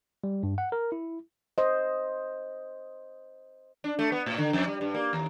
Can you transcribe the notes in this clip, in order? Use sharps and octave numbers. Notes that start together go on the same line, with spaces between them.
G3
G2
F#5
A#4
E4
C5 D#5
D4
A3
B3
A2
D3
F2
G3
G2
A#3
D#2